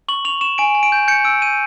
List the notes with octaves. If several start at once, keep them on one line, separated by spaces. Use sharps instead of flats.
C#6 F#7
C#6 F7
C#6 E7
G#5 D7
G#5
D7
G6
G6 C#7
E6 D7
G6 D#7